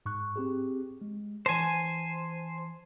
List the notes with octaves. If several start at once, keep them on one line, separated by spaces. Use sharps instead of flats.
G#2 C#6 F#6
C4 G4 G#4
G#3
E3 C5 G#5 A5